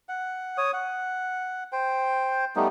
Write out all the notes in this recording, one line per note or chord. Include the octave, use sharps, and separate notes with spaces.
F#5
C#5 D#6
F#5
C5 G5
G3 A3 B3 D#4